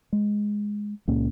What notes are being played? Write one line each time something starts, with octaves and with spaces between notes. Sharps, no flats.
G#3
C#2 A#2 A#3 C#4